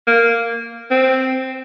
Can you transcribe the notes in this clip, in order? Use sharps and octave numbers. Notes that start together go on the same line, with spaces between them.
A#3
C4